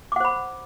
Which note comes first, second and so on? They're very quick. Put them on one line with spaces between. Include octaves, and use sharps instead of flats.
D6 F#5 C5 B5